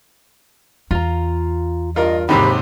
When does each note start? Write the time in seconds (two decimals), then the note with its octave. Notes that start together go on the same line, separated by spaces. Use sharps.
0.91 E2 F4 A#5
1.96 G2 F4 A#4 D#5
2.29 D#2 G#2 C3 E3 G4 A#4 B5